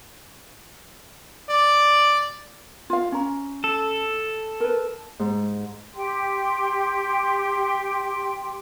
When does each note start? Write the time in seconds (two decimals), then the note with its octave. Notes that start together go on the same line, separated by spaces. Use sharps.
1.49 D5
2.90 F4 F5
3.12 C#4 A#5
3.64 A4
4.60 A#4 B4
5.20 G#2
5.95 G4 G5 C6